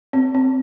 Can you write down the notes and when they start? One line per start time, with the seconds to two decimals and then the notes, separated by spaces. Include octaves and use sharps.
0.13 C4
0.35 C4